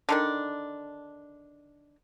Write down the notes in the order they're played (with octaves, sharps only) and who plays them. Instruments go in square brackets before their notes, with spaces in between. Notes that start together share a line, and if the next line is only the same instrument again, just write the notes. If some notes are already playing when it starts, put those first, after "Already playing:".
[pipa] D3 D#3 D4